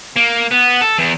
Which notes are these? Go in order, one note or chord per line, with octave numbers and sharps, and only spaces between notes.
A#3
B3
A4
E2